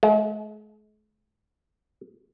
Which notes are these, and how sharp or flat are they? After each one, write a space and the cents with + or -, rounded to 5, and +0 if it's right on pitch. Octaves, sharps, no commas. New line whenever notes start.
G#3 +45